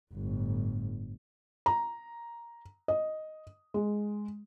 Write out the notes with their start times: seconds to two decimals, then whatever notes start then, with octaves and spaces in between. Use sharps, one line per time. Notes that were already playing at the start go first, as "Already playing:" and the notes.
0.14 G1 A2
1.66 A#5
2.88 D#5
3.74 G#3